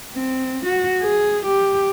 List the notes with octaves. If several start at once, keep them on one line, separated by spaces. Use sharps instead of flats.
C4
F#4
G#4
G4